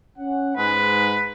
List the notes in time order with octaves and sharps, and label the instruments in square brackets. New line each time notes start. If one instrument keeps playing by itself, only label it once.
[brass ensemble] C#4 F#5
[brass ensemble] G#2 G#3 [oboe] B4